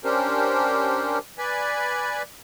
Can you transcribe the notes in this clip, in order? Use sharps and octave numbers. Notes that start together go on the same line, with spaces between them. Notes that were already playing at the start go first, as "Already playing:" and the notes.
C#4 D4 G4 A#4 C5
B4 D5 G#5 B5